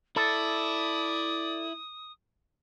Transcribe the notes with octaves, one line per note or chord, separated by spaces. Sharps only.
E4 A4 D5 D#6